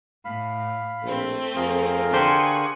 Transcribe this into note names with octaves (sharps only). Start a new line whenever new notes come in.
A2 F5 B5
A#1 A3 C4
F2 G#4 A#4 F5
D3 G4 C5 F#5 G#5 C#6